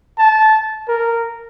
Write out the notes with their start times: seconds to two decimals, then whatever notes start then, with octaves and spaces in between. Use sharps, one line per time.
0.18 A5
0.88 A#4